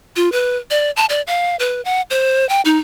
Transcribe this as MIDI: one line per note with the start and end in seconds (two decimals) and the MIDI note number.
0.16 0.31 65
0.32 0.57 71
0.71 0.91 74
0.97 1.05 81
1.09 1.21 74
1.27 1.56 77
1.59 1.81 71
1.85 2.01 78
2.10 2.48 72
2.49 2.61 79
2.65 2.78 63